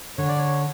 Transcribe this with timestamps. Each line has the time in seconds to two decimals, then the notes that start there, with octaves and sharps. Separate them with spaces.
0.18 D3 C#5
0.28 D5
0.39 C#5